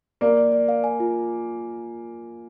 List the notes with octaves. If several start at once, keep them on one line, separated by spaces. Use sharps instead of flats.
A#3 A#4 D5
D5
D5
F5
G#5
F4